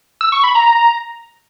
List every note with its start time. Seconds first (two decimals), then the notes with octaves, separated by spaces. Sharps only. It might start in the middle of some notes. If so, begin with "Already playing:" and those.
0.21 E6
0.32 C#6
0.44 B5
0.55 A#5